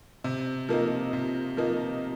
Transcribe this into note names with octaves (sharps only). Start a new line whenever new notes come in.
C3
F3 A#3 D#4
C3
F3 A#3 D#4